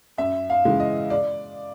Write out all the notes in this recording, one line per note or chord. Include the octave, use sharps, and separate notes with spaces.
F#2 E5
F5
C#3 E3 G#3
D#5
D5